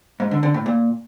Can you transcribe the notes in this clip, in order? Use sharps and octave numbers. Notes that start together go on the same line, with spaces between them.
G#2
D3
D3
A2
A#2